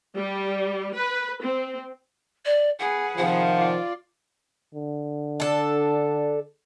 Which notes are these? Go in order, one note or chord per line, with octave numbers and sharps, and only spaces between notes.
G3
B4
C4
D5
G#4 B4 F#5
C3 D#3 F3 F#5
F4 D5
D3
D4 A4